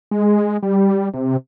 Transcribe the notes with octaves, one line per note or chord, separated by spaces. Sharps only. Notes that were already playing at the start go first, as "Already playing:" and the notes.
G#3
G3
C3